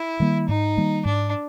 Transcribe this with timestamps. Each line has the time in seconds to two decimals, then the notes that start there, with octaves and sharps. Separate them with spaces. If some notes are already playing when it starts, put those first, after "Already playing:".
Already playing: E4
0.20 D#3 G3 A#3
0.49 G#2 D#4
0.77 D#3 G3 A#3
1.05 G#2 D4